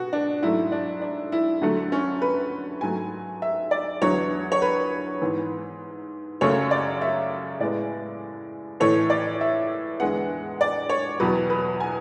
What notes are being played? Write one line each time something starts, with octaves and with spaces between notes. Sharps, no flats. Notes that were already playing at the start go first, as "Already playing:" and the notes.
Already playing: B2 F#4
D4
G#2 F#3 A3 E4
D4
D4
E4
D2 D3 F#3 A3
C#4
B4
G#2 F#3 A3 G#5
E5
D5
E2 D3 F#3 B3 C#5
C#5
B4
G#2 E3 B3
F#2 C#3 F#3 A3 C#5
D5
E5
A2 G#3 B3 D5
A2 E3 A3 C#5
D5
E5
E2 D3 G#3 B3 F#5
D5
C#5
E2 B2 F#3 B4
B4
G#5